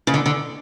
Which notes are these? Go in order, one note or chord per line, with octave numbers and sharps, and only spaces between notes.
C#3
D3
D3